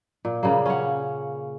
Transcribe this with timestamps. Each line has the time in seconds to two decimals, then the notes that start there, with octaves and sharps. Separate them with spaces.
0.25 A#2
0.43 C#3 G3 A#3
0.66 C#4 F#5